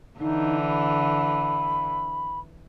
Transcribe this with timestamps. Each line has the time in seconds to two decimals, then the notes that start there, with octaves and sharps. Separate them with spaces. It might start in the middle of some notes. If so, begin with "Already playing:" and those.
0.20 D3 E3 D#4
0.67 B5